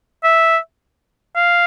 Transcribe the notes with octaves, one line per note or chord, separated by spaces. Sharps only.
E5
F5